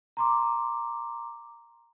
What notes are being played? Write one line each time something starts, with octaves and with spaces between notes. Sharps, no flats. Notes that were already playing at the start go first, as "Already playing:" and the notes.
A#5 C6 D6